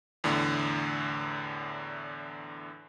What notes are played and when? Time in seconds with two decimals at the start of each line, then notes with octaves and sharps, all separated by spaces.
0.24 E2 A2 D3